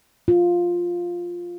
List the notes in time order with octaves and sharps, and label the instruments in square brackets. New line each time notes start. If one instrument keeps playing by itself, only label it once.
[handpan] F4